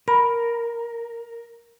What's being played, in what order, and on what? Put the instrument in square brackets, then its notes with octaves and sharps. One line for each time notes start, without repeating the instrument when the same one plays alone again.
[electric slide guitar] A#4 [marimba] B5